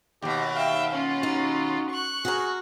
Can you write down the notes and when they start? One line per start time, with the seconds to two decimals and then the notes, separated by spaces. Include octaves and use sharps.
0.22 D#2 B2 G4
0.56 E5 F5 G5
0.92 C#4 F4
1.23 D#4 F#4
1.90 C#6 F#6
2.25 F#4 G#4 A#4